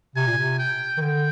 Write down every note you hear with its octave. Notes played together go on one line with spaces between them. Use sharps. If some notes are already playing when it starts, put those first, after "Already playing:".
C3 G#5
A#2
C3
G5
D#3
D3 G5